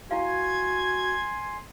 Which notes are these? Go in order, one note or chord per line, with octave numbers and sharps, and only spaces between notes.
E4 F#4 F5 G#5 C6 G#6